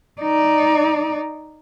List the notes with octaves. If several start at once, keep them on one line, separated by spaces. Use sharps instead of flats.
D#4 D5